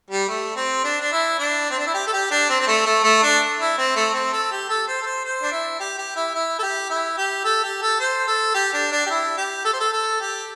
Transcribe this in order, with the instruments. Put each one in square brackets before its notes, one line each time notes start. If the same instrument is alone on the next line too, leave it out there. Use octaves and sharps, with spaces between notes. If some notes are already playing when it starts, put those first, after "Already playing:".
[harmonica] G3
A3
C4
D4
D4
E4
D4
C4
D4
E4
G4
A4
G4
D4
C4
C4
A3
A3
A3
D4
E4
C4
A3
C4
A4
G4
A4
C5
A4
C5
C5
D4
E4
G4
G4
E4
E4
A4
G4
E4
G4
A4
G4
A4
C5
A4
G4
D4
D4
G4
E4
G4
A4
C5
A4
A4
G4